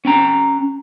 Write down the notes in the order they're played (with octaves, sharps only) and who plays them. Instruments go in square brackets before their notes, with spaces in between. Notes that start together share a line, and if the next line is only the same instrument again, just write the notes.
[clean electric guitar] C#4 G5 A#5